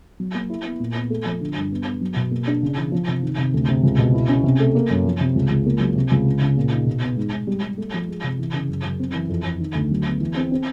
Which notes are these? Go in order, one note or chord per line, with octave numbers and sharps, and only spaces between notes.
F#3
A#3
E4
B3
A#2
B3
A3
F3
D3
G2
B3
B3
F#3
B2
A#3
D4
C#3
E3
F3
C3
D#3
C3
D2
C3
C#2
B2
E4
C#4
C3
A3
A#3
F#2
F3
C3
C#2
C#2
A#3
F#3
C3
C#2
C#3
C#3
A#2
D#4
B2
B3
G#2
G#2
G3
G3
A3
F3
G#3
C3
E3
C#3
F#2
F#2
C4
E3
F2
F2
D#3
D2
F#3
B3
E3
C4
C4